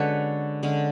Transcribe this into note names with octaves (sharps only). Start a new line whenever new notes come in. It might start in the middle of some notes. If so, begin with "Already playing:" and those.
Already playing: D3 G#3 C#4 F#4 A4 B4 C#5
D3 G#3 C#4